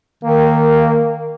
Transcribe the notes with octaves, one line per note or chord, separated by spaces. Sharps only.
D#3 A#3